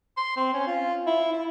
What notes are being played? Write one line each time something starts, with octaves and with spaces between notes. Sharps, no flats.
C6
C4
C#4
F4
E4
E4